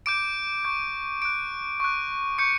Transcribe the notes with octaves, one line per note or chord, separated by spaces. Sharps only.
D6 G6 D7
C#6 G6
D6 F#6 D7
C#6 F#6
C#6 G6 C#7